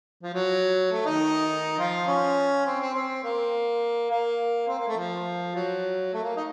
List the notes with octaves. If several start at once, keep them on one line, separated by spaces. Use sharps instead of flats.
F3
F#3
A3
D#3 D#4
F3 F4
C#4
C4
C4
C4
A#3
A#3
C4
A#3
A3
F3
F#3
A3
A#3
D#4